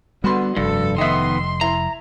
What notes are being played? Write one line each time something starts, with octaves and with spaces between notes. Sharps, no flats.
D3 G3 B3 F#4 B4 C6
F1 G2 A4
D#3 B3 D#5 E5 C6
E4 A#5